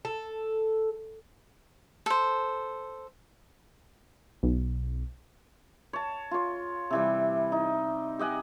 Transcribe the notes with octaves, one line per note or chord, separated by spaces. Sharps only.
A4
A4 C5
B1
C#5 A5
F4 C#5
C3 E3 G3
D#4
G4 D#5 F#5 G#5